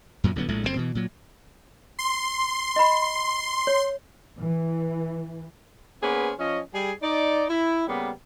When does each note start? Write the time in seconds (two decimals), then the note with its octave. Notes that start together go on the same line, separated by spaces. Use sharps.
0.24 F#2 A#2 F#3
0.36 A1 D3 F#3 B3
0.49 A#1 A2 G#3 A3
0.64 F#1 F2 G#2 C4
0.76 B2 E3
0.95 A#2 F#3
1.99 C6
2.76 D#5 B5
3.67 C#5
4.38 E3
6.02 A#3 B3 C#4 G#4 B4 C5
6.40 F3 C#4 D#5
6.74 G3 G#4 G#5
7.03 D#4 D5
7.49 E4
7.88 C#3 G3 A#3 B3